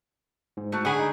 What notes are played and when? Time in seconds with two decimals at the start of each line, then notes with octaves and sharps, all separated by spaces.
0.57 G#2
0.72 A3 F#4
0.85 D3 G#4 F#5 G#5 B5 C#6
0.99 D#4